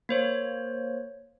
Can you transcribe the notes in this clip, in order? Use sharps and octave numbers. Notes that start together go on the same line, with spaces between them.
A#3 C5 C#5